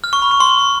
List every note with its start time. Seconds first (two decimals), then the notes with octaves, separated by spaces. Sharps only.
0.04 F6
0.13 C#6
0.22 B5
0.31 C#6
0.40 C6